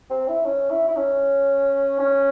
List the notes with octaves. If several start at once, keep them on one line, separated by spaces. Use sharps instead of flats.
C4
E4
C#4
E4
E4
C#4
C#4